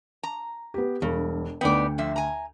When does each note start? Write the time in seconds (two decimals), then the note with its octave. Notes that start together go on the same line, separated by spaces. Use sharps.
0.23 A#5
0.74 B3 G4
1.02 E1 G2
1.61 D2 B3 D#4 D5 G5
1.98 D3 F3 E5
2.16 G#5 A#5